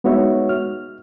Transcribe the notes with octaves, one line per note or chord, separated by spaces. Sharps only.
G#3 B3 D#4 F#4 C#5 E5
F6